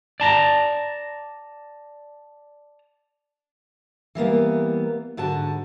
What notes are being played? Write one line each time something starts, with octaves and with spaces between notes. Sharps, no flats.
D5 A5 A#5
E3 G3 A#3 B3
G#2 D3 F#4 A5